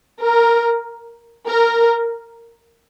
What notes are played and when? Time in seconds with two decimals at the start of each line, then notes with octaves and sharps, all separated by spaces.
0.23 A#4
1.48 A#4